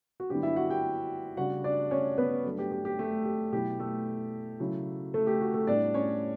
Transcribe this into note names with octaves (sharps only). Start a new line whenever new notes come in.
F#4
G2 D3 F#3 B3 E4 G4
E4 E5
F#4 F#5
G4 G5
C#3 G3 D4 F#4 F#5
D4 D5
C#4 C#5
B3 B4
G2 F#3 A3
G4
G4
G4
A3 A4
G4
B2 F#3 B3 E4 G4
A3 A4
C#3 F#3 C#4 E4
A3 A4
G4
F#4
A3 A4
A2 G3 B3 D4 D5
C#4 C#5